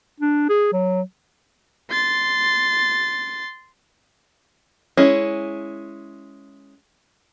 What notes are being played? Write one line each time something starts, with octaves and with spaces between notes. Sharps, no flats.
D4
G#4
F#3
C6 A6
G#3 C#4 E4